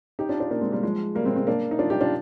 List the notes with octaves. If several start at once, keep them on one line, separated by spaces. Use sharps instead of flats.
D#4 G4
D4 F4
D4 F4
A#3 D4
G#3 C4
G3 A#3
F3 G#3
G3 A#3
G#3 C4
G#3 C4
A#3 D4
D#4
D4 F4
D#4 G4
D4 F4